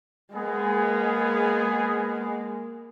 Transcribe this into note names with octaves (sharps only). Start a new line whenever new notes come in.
G#3 A#3 B3 G#4